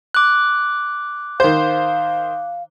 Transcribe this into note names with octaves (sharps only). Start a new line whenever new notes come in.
D6 F#6
D#3 C5 F5